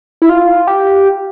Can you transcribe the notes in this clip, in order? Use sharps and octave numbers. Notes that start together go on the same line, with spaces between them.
E4
F4
G4